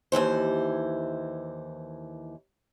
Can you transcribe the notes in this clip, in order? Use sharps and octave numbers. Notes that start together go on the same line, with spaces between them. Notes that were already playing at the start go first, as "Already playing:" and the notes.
D#2 D#3 E3 C5